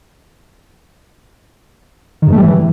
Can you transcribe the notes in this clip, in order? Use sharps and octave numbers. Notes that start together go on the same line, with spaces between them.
D#3
G2
A3
G3
E3